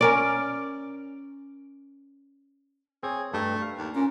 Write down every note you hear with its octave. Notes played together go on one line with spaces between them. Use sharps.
C#4 A#4 D5
C4 G#4 C#5
G2 A3 A#5
F5
D#2
A#2 C#4